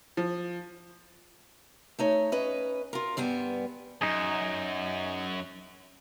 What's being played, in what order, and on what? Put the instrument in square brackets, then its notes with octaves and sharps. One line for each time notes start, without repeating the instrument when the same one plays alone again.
[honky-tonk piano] F3
[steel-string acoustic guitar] A3 D#4 C#5
C#4 B4 D#5
F4 A#4
G2 G3 B3 G#5
[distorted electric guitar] F#2 [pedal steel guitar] D#4 G#4